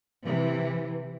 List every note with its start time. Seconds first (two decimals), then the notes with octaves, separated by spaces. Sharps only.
0.24 C3 E3